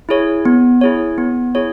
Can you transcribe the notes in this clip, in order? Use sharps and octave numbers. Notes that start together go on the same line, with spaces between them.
E4 G#4 C#5
B3
E4 G#4 C#5
B3
E4 G#4 C#5